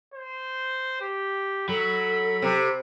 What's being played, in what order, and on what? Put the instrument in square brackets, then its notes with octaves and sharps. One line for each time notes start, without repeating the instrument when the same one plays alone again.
[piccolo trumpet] C5
G4
[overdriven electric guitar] F#3 [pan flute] A4 [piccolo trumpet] B5
[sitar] C3